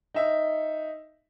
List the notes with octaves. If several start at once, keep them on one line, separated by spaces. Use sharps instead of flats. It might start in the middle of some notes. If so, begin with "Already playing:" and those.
D#4 E5